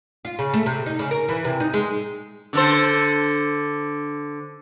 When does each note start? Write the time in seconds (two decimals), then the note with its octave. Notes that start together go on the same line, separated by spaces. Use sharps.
0.25 F4
0.39 C#3
0.54 A3
0.66 C3
0.86 D#4
0.99 C#3
1.11 A#4
1.29 E3
1.45 C3
1.60 D#4
1.74 G#3
2.53 D3 A4 C5